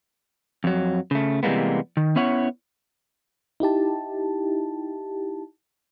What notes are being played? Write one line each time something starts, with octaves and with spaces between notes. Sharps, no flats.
F2 F#3
C#3 A3
C3 E3 G3 G#3 A#3 B3
D#3
B3 C#4 E4 C#5 F#5
D#4 E4 G4 A5